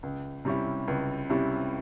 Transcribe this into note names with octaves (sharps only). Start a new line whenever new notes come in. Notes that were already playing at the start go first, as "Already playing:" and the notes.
C#2
C3 G3 C#4 E4
C#2
C3 G3 C#4 E4